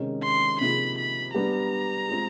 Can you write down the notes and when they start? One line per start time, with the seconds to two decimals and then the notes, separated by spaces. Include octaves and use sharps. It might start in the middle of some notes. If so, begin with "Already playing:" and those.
Already playing: C3 D#3 G#3 C#4
0.23 C6
0.61 C3 F3 A#3 D#4 G#4 B5
0.98 B5
1.34 G3 B3 D4 G4 A#5
2.08 G#3 C4 F4 G#4